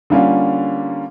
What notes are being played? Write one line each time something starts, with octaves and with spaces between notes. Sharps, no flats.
D3 G3 A#3 C#4 F4